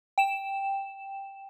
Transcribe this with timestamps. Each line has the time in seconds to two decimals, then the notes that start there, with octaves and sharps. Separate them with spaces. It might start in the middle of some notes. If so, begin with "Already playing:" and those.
0.18 G5 E7